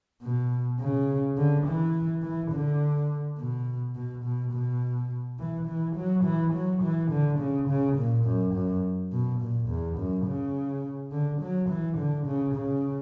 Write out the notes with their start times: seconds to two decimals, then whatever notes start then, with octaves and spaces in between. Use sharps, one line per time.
0.22 B2
0.80 C#3
1.37 D3
1.67 E3
2.23 E3
2.52 D3
3.38 B2
3.95 B2
4.24 B2
4.53 B2
5.39 E3
5.68 E3
5.96 F#3
6.24 E3
6.54 F#3
6.83 E3
7.11 D3
7.39 C#3
7.69 C#3
7.97 A#2
8.25 F#2
8.55 F#2
9.12 B2
9.40 A#2
9.69 E2
9.98 F#2
10.26 C#3
11.12 D3
11.42 F#3
11.70 E3
11.98 D3
12.27 C#3
12.55 C#3